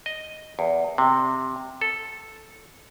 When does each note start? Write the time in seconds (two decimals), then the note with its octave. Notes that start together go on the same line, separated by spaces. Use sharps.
0.06 D#5
0.59 E2
0.98 C3
1.81 A4